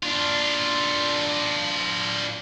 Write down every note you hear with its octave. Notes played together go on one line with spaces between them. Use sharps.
D4 F4